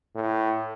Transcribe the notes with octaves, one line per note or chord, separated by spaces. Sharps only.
A2